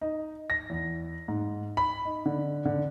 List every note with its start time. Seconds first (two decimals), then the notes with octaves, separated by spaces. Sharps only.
0.01 D#4
0.50 A#6
0.70 E2
1.28 G#2
1.77 B5
2.05 D#4
2.26 D3
2.65 D3